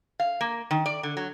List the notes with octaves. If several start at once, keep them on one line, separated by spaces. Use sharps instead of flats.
F5
A#3
D#3
D5
D3
F#3